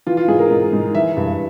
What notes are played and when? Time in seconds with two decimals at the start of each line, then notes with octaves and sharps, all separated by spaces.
0.07 E3 F4
0.17 F4
0.28 G#2 G#4
0.39 A#4
0.51 G#2
0.73 G#2
0.95 E3 E5
1.17 G2